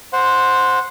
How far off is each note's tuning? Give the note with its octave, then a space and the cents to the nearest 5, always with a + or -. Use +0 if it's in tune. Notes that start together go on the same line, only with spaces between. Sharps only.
C5 +0 F#5 -15